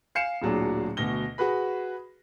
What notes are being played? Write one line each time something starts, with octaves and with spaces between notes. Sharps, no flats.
F5 G#5 C7 C#7 E7
D1 A#2 F#3 D4 G#4
D2 B2 A#6 G7
F#4 G#4 B4 B5